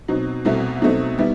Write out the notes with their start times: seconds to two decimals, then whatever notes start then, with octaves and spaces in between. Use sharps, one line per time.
0.08 B2 F#3 C4 D#4
0.45 C2 B2 A3 C4 E4
0.82 B2 F#3 A3 C4 D#4
1.18 D#3 G3 B3 E4